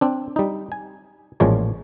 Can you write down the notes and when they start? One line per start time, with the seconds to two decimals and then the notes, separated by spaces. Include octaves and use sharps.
0.01 C4 D4
0.36 G3 D#4
0.72 G#5
1.40 A1 A#2 F3 G#3 C#5